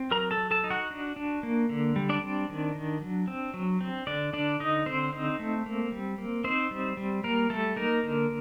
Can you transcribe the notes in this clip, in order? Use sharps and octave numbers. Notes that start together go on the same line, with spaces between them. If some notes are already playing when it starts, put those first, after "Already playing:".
Already playing: C4
F#3 A#4 A#5
A4 A5
F#3
A4 A5
D#4
F#4 F#5
D4
D4
A#3
D3
G3
D4 D5
C4
D#3
D#3
F#3
C4
F#3
C4
D3 D4 D5
D3 D4 D5
D3 D#4 D#5
D3 C4 C5
D#4
A3
A#3
G3
A#3
C4 D#4 C5
G3
G3
G3 A#3 A#4
G3 A3 A4
A#3 D#4 A#4
D3